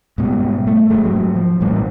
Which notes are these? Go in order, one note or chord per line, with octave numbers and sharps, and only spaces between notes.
G#2 B2 G3
A3
E1 G2 G#3 A3
G#2 F#3
F3
A1 G#2 G3 A#3